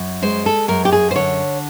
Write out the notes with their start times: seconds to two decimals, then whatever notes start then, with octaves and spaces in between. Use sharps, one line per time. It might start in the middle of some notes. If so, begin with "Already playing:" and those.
Already playing: F#2
0.22 G#3 C5
0.46 A4
0.68 F#2 A#4
0.85 G4
0.92 G#4
1.11 C5
1.15 D3 C#5